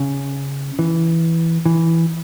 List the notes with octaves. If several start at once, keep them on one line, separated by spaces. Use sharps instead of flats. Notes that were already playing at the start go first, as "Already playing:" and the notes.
Already playing: C#3
E3
E3